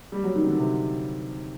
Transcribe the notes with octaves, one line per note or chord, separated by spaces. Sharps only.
G3
F#3
D#3
D3
C3